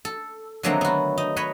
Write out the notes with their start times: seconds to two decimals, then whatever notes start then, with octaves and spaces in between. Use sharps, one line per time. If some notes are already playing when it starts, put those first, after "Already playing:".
0.05 A4
0.63 D3 D#3 F#3 A3 A#3 C4
0.81 B3 F#4
1.18 D#4
1.36 B4 C#5 D#5 B5